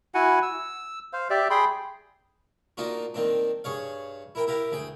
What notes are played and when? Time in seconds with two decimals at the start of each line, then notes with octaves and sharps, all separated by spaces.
0.14 E4 F#4 F#5 G#5
0.42 E6
1.13 C5 F5
1.30 G4 D5 E5
1.50 G#4 G5 B5 C6
2.77 A#3 D4 D#4 F4 F#4
3.14 D#3 A#3 C4 D4
3.64 G2 G#4 C#5 F5
4.35 E4 A#4 G5
4.47 E4 G4 A#4 F5
4.72 D2 G#4 G5